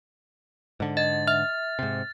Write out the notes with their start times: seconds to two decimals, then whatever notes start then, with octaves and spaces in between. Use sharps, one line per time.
0.80 G#2 D3
0.97 D#5 A6
1.28 E5 F6
1.79 G#2 C3